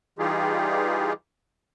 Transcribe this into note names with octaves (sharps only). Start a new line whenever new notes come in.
E3 G3 D#4 F4 G4 G#4